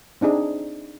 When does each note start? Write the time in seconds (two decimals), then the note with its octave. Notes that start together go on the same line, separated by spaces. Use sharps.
0.21 C4 D4 D#4 G#4